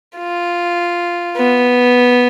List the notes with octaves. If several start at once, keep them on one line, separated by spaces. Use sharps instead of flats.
F4
B3